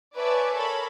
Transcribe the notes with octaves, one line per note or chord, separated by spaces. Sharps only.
B4 C#5 D5 E5 G#5 A5
A4 A#4 C#5 B5